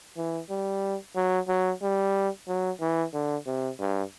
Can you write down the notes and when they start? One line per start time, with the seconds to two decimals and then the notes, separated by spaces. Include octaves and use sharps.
0.17 E3
0.49 G3
1.16 F#3
1.48 F#3
1.82 G3
2.48 F#3
2.81 E3
3.13 D3
3.47 C3
3.80 G2